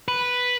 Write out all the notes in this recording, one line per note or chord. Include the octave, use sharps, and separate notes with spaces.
B4